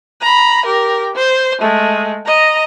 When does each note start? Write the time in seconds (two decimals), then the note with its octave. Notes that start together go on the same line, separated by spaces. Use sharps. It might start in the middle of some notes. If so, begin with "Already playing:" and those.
0.22 A#5 B5
0.66 G4 A#4
1.16 C5
1.61 G#3 A3
2.26 D#5 A#5